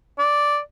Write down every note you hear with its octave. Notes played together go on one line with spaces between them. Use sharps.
D5